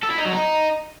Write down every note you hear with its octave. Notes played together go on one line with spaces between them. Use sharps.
A4
E4
D#4
F#3
D#4